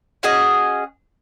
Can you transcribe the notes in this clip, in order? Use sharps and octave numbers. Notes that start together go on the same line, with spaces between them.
C#4 F#4 G#4 D#5